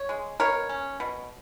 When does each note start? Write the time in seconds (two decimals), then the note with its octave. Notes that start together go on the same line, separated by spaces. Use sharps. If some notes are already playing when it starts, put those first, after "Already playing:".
Already playing: C#5
0.09 G#3
0.40 B2 A#4 C#5
0.69 C#4
1.00 B2